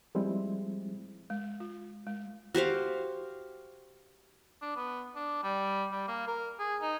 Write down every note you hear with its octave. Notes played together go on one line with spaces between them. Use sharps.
F3 G3 G#3 C4 E4
G#3
F4
G#3
F#4 G4 C5 F5
D4
B3
D4
G3
G3
A#3
A#4
G#4
D#4